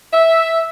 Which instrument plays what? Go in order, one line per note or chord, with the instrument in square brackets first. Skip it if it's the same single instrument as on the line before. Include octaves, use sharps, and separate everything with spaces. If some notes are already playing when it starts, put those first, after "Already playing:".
[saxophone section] E5